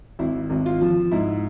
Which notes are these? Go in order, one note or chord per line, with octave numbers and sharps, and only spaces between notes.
G#1 E4
G#1
F4
F3
G#2 E4